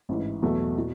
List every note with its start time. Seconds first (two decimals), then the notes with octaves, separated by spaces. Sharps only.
0.09 A1 G#2 E3
0.43 E2 B2 F#3 A3
0.78 B2